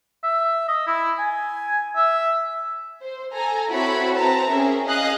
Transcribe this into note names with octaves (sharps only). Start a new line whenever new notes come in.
E5
D#5
E4
G#5
E5
C5
A4 G#5 A#5
C4 E4 F#4 A4 C#5 B5
C4 B4 A5 A#5
C#4 G#4 A#4 E5
G#4 D#5 F5 D#6 F#6